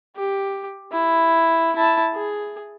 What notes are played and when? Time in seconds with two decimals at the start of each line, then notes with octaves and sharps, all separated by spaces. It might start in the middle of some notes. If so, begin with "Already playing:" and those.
0.16 G4
0.92 E4
1.76 E4 A5
2.14 G#4